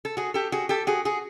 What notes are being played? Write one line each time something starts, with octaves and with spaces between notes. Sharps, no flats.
A4
F#4 G#4
G4 A4
F#4 G#4
G4 A4
F#4 G#4
F#4 G#4